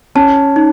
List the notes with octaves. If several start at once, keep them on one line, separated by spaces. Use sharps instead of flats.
C#4 A5
D#4